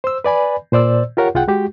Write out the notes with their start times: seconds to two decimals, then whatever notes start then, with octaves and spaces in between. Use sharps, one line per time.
0.04 C5 E6
0.24 B4 D5 G#5 B5
0.72 A#2 C5 D5 E6
1.17 F4 G4 A#4 C#5 F#5
1.35 C2 F4 G#4 F#5 G5 F#6
1.48 G#3 F#4 G4